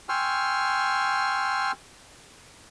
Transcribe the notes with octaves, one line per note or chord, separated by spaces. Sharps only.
G5 G#5 C6 C#6 E6 F6